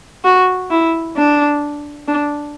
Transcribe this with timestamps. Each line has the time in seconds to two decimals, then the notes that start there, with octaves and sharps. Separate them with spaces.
0.25 F#4
0.70 E4
1.17 D4
2.08 D4